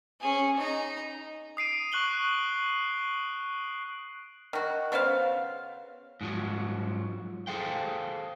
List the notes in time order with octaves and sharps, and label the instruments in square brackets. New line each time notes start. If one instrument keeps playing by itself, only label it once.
[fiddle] C#4 G#4
D#4 A#5
[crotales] D#6 C7 D7 D#7
C#6 F#6 F#7 G7
[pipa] D#3 F#4
C#3 B3 C5 F5
[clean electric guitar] G#2 F3 F#3
G#4 A4 C5 F5 G5